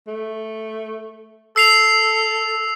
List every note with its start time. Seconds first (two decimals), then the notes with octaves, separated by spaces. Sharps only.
0.07 A3
1.56 A4 E6 C7 F7